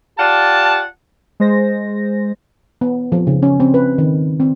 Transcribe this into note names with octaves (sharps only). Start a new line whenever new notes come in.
F4 G4 D5 F#5 A5
G#3 C5 A#6
B3
F3
C#3
C#4
C4
B4
D#3
C4